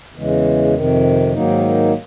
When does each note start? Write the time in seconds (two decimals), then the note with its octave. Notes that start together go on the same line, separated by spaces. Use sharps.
0.14 E2 C#3 E3 G#3
0.74 F2 C3 D#3
1.33 G#2 D#3 F#3 A#3 D#4